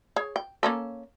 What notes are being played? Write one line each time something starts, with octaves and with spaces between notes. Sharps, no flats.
G#4 C#5
G5
A#3 C#4 A4